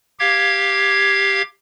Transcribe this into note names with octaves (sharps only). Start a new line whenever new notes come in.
G4 F5 G#6